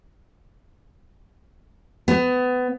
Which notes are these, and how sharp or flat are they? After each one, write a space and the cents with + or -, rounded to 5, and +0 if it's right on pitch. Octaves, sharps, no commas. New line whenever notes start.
B3 +25